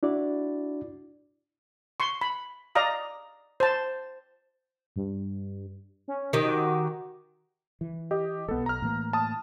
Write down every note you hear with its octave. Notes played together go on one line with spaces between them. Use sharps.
D4 E4 F#4 D5
C6 C#6
B5
D5 D#5 F5 A#5 D#6
C5 A5
G2
C#4
D#3 G4
F#4
E3
G4 D#5
E1 B1 B3 A4
A#5 F6
A2 E3 A#3
A5 D#6